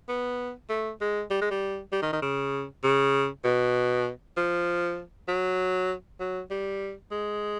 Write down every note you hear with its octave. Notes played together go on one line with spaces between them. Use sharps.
B3
A3
G#3
G3
G#3
G3
G3
D#3
D#3
C#3
C#3
B2
F3
F#3
F#3
G3
G#3